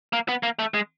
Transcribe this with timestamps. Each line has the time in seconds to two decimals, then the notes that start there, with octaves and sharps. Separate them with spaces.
0.13 A#3
0.29 B3
0.43 A#3
0.59 A3
0.74 G#3